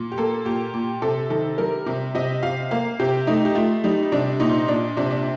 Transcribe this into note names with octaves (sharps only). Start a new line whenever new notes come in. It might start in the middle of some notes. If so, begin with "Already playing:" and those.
Already playing: A#2
G4
A#3 A4
A#2 G4
A#2
C3 A4
D#3 A4
G3 A#4
C3
C3 D#5
C3 F5
A#3 F5
C3 G4
A3 D#4
G4
A3 F4
G3 D#4
C3 D4
A#2 D#4
A#2 D4
C3 D4
D4